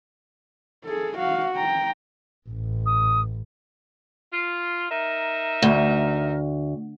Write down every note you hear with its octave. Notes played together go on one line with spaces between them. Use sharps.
G#4 A4
F#4 F5
G5 A#5
A1
D#6
F4
D#4 A#4 E5
D2